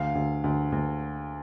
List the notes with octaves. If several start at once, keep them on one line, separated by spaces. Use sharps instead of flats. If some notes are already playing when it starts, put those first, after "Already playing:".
Already playing: D2 F5
D2
D2
D2